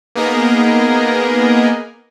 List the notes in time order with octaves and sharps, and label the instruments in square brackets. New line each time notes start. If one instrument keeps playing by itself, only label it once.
[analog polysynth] A#3 B3 D#4 G#4 A#4 D#5